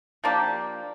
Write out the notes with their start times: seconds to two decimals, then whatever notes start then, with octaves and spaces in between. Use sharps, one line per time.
0.24 F3 A#3 D4 G4